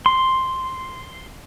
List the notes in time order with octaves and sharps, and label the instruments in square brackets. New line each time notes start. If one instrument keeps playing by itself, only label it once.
[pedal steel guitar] C6